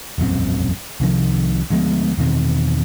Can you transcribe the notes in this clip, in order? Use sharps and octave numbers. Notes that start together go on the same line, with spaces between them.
E1 A#1 F#2 C4
C2 C3 D#3 F3
D2 F3 G#3 B3
E2 B2 D#3 C4